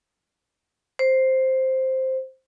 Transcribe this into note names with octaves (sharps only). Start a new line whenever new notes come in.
C5